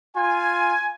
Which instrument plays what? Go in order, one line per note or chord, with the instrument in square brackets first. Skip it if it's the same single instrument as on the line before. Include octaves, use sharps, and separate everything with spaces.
[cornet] F4 [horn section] G#5